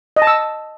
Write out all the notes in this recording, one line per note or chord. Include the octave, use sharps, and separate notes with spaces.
D#5
A5
E6